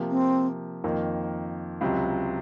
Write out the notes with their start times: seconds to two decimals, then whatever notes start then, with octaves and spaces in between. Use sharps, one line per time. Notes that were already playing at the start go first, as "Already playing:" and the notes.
Already playing: C3 F3 A#3
0.10 C4
0.84 F2 D#3 A#3
1.81 C#2 C3 F#3